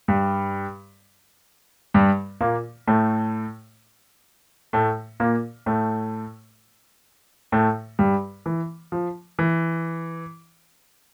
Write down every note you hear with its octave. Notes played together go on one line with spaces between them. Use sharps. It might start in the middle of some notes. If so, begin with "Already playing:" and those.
G2 G3
G2 G3
A#2 A#3
A2 A3
A2 A3
A#2 A#3
A2 A3
A2 A3
G2 G3
E3
F3
E3